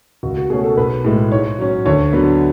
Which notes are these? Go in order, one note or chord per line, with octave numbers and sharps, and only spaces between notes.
C#2 F#4
F#4
B2 A3 C#4 G#4
A4
B1 B4
A2 G#3
G#2 C#5
F#3 C#4
D2 C#5
D3 F#3 B3